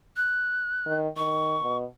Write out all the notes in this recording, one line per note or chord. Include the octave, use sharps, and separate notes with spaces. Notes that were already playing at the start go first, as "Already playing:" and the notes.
F#6
D#3
D#3 C#6
B2